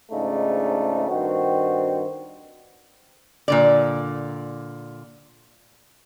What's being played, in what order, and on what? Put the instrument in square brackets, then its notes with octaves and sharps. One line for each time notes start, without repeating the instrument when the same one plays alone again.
[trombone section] G#2 C#3 F3 A3 D4 D#4
G2 D#3 C4 F#4
[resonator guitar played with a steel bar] A#2 D3 D5